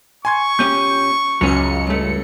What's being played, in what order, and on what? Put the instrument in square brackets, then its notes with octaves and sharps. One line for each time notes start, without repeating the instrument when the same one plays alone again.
[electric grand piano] G#5 C6 G#6 [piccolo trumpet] C#6
[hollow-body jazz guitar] A#2 C#4 G4 [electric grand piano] G6
[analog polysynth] C#2 C#7 [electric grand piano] F#2 [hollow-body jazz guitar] F#3 C#4
[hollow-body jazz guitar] G2 A3